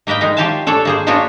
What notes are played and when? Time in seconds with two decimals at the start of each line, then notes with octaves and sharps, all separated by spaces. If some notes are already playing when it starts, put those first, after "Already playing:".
0.07 A#3 A#4 B4 D#5 G5
0.21 G#3 D#4 A#4
0.37 F4 G4 C#5 F5 G#5 A5
0.67 D4 A4 C#5 D5
0.85 A#3 G#4 C5
1.07 A#3 B3 D4 F4 F#4 C#5